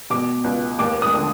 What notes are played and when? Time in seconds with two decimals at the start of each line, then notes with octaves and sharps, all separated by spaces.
0.10 B2 D6
0.44 C#2
0.79 D#2 D6
1.02 D#6
1.14 D3